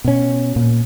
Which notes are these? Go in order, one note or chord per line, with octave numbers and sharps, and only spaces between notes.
B2 C#4
A#2